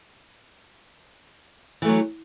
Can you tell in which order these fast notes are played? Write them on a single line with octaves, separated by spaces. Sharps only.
E3 A3 F#3